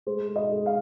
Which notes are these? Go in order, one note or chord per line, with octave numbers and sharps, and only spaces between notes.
G#3 C5
G#3
D#5
G#3
F5